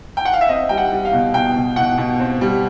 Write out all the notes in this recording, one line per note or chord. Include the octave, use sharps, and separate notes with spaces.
G5
F#5
F5
E5
C4 D#5
G3 G5
F#5
G3
F5
B2
B2 G5
B2
B2 F#5
B2
C4
G3